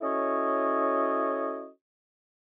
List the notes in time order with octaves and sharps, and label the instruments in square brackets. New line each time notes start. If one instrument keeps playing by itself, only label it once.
[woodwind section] C#4 E4 F#4 A4 C#5 D#5